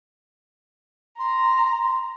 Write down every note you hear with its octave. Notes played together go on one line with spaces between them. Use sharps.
A#5 C6